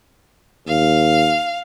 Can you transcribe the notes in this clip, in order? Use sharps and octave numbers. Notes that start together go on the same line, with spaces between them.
D#2 F5